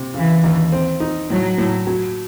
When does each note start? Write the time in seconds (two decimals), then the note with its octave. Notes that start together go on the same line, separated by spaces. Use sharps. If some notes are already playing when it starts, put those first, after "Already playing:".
Already playing: C3
0.14 C#3 E3
0.44 D#2
0.72 C4
1.00 D#4
1.30 A2 F#3
1.58 A2
1.87 F#3